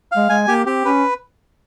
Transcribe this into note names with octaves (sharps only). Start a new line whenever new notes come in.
G#3 F5
G#3 G#5
A#3 G4
C4 G4
C#4 B4